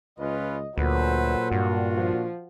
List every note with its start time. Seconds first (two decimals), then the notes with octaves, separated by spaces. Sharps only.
0.19 C#2 C#4 F4 B4 D#5
0.78 D2 A#2 F#3 A4 B4 C5
1.52 G2 D4 F4 F#4
1.95 F3